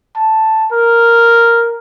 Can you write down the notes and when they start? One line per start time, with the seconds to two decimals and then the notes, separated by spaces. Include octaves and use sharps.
0.15 A5
0.72 A#4